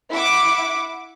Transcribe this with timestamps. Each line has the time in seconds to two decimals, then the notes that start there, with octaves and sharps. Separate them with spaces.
0.11 E4 E5 F#5 D6